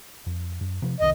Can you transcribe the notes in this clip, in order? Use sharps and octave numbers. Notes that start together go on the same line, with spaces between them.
F2
F#2
C3 F3 C4
F1 C2 D#3 D#5